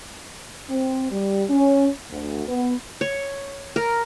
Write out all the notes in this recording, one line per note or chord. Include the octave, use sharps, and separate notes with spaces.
C4
G3
C#4
D2
B3
C#5
A#4